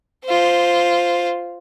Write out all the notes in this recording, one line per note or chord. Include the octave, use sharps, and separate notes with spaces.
F4 C5